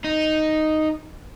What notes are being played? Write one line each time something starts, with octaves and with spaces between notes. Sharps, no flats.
D#4